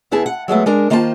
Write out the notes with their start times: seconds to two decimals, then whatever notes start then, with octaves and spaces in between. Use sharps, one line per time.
0.11 E2 B3 E4 G#4 A5
0.26 F#5
0.48 F#3 G#3 A3 B3
0.66 G#3 D4 A#4
0.90 D#3 A#3 F4 C5 E5 A5